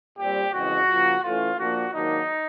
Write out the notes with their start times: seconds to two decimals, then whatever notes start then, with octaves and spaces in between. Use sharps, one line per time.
0.18 A#2 G3 C4 G4
0.53 F2 C#3 E3 G#3 F#4
0.89 C#3 F3 A#3
1.24 A2 E3 A3 C#4 F4
1.58 A#2 F3 A#3 D4 F#4
1.94 G#2 D#3 F#3 A#3 D4 D#4